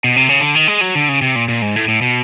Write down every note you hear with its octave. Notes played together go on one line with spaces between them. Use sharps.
B2
C3
C#3
D3
D#3
G#3
F#3
D3
C#3
C3
A#2
A#2
G#2
A2
A2
B2